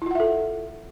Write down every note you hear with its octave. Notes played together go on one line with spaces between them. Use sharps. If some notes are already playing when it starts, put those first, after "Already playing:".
E4 F4 A4 E5 F#5